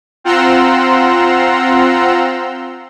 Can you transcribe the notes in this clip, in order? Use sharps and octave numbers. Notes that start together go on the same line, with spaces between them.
C4 F4 F#5 A#5 C6 E6